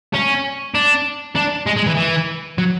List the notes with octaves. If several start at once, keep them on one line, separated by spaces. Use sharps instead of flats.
C#4
D4
D4
G#3
G#3
E3
E3
F#3